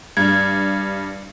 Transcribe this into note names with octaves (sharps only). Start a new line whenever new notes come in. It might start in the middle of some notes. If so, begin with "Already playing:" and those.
G2 G#6